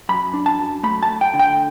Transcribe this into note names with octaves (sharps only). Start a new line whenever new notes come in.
F#2 B5
D4
A5
F#2
A3 B5
A5
A3
G5
D3
G5